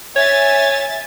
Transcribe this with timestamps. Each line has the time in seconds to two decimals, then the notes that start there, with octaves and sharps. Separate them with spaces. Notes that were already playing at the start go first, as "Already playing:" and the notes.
0.16 C#5 E5 G#5 A6